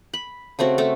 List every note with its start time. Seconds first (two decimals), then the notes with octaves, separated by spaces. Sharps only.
0.14 B5
0.59 C#3 A3 C4 F#4
0.78 A3 A4